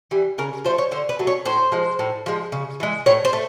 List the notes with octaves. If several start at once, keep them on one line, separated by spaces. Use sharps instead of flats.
E3 G3
C#3 A#4
F3 A3 C5
C#5
D3 C5
B4
F#3 A3
C#5
A2 C5
F3 G#3
A2
F3 G#3
C#3
E3 G#3
A2 C#5
C5
A3